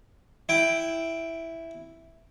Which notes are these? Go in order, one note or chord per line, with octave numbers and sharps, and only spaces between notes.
E4 G5